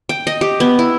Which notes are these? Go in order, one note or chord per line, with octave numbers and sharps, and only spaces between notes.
G5
D#5
G4
B3
E4